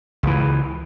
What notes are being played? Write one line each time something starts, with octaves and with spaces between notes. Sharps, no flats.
C#2 E3